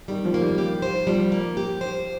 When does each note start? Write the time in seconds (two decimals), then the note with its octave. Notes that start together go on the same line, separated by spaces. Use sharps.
0.08 D#3 G3
0.25 F3
0.34 A#3
0.42 G3
0.58 G4
0.82 C5
1.07 F3 G3
1.32 A#3
1.57 G4
1.81 C5